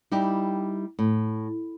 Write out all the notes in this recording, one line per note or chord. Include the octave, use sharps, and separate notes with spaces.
G3 D#4 E4 G4
A2